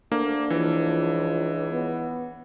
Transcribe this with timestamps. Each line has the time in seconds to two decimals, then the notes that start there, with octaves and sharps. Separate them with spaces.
0.12 D2 A#3 D4
0.50 C#2 E3 F3
1.71 B3